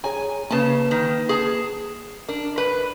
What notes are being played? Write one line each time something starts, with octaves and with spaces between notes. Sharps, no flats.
G#4 C#5 G#5 A#5
C#3 A#3 B4 A5
D#3
G#4 A5
D4 A#4
B4